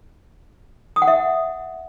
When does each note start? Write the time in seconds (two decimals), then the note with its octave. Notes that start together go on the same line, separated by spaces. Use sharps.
0.96 D#6
1.02 F#5
1.08 E5